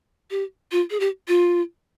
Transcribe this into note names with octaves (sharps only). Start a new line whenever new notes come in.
G4
F4
G#4
G4
F4